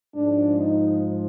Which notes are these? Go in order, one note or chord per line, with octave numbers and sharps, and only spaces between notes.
G#2 F3 G#3 D4
D#4